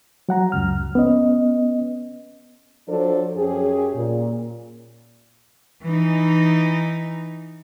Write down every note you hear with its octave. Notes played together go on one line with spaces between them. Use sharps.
F#3 F#5 A#5
C#2 F#2 F6
B3 C#4 D#5
F3 F#3 D4 A4 C5
F#2 C#4 G4 G#4
A#2
E3 D#4